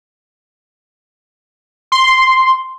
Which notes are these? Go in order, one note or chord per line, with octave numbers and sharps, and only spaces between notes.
C6